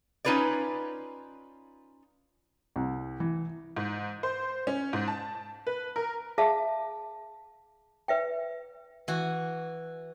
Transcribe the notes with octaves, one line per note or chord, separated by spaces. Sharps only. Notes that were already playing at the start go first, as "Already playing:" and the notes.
C#4 D#4 F4 B4 C#5 D5
C2
E3
G#2
C5
C#4
G#2
A5
B4
A#4
G#4 E5 F5 A5
B4 E5 G5
E3 F#4